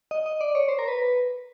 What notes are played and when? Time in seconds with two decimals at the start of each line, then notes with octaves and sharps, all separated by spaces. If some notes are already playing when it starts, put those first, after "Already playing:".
0.11 D#5
0.26 D#5
0.41 D5
0.55 C#5
0.68 C5
0.79 A#4
0.88 B4